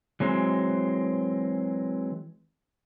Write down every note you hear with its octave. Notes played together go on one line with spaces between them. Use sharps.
E3 F#3 G#3 C4